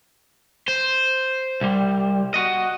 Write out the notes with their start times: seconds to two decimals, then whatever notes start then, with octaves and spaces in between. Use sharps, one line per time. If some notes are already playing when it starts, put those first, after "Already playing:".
0.68 C5
1.61 C2 G3
2.34 F#4 D#5